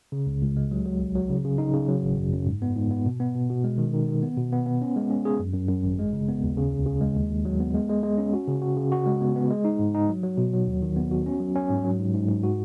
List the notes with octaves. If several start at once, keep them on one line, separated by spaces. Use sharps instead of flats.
C#3
C#2
C#2
G#3
F#3
F#3
B1
F#3
C#3
C#3
D#4
C#3
F#3
G#1
F#2
F#2
G#2
B3
G#2
B3
B2
B3
B2
B2
G#3
D#3
D#3
D#3
B3
B2
B3
B3
C#4
G#3
C#4
G#4
F#2
F#2
F#2
G#1
G#3
C#3
B3
D#2
C#3
C#2
C#3
G#3
D#2
D#2
F#3
B3
G#3
G#3
G#3
C#4
F#4
C#3
F#4
C#3
F#4
G#3
B3
B3
G#3
D#4
G#2
D#4
F#3
F#3
B2
F#3
D#2
D#3
B3
F#4
C#4
F#3
C#4
G#2
F#3
G#2
G#2
G#2
F#4